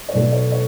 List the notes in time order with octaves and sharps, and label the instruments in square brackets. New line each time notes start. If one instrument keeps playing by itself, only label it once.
[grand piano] C#5
B1 B2 A3 D5
C#5
C#5